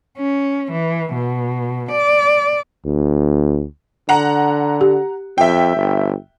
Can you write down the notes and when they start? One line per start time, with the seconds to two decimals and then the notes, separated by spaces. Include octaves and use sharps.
0.18 C#4
0.72 E3
1.14 B2
1.91 D5
2.85 D2
4.09 D3 F#5 A#5
4.81 G4
5.38 F2 E5 G5
5.76 G1